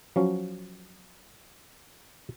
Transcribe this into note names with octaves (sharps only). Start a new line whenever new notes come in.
F3 F#3 C#4